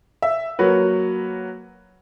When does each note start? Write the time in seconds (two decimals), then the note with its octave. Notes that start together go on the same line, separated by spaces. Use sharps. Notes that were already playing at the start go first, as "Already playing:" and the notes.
0.22 E5
0.59 F#3 A#3 F#4 B4